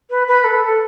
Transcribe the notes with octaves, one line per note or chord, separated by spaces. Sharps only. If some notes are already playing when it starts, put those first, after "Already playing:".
B4
B4
A4
A4